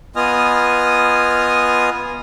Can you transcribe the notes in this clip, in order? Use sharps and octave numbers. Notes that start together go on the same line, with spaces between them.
B3 F4 D#5 G#5 D#6 F6